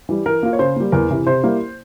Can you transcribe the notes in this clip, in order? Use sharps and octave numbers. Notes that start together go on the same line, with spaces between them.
E3 G3
E3 A#4
A#3 F4
C#5
C#3 C5
G3 A#3
E2 A#4
C3 E3
C3 C5
G3 A#3 E4